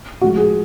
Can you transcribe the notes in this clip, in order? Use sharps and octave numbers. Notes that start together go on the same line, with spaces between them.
A2 F3 G#3 F#4
G#4